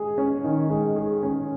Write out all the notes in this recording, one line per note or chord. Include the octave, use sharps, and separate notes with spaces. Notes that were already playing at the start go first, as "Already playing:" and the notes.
Already playing: G#3 G#4
C#4
D#3
G#3
G#4
C#4